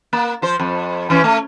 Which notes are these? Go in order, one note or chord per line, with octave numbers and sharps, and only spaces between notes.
A#3
F3 C5
F2
E3 C#4
A3